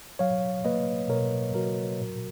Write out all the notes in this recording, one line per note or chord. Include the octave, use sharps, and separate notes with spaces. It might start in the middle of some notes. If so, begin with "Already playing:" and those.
F#3 C#5 F5
A#3 B4 D#5
B2 A#4 C#5
F#3 F#4 A#4
A#2